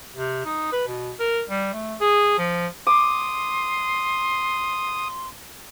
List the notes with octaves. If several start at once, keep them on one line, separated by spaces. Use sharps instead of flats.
C3
D#4
B4
B2
A#4
G3
A3
G#4
F3
C6 D6 D#6